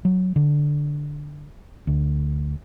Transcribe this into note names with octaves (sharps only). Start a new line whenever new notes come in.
F#3
D3
D2